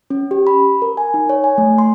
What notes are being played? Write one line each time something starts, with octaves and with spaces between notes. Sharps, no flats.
C#4
G4
B5
A#4
G#5
D#4
C#5
G#5
A3
C6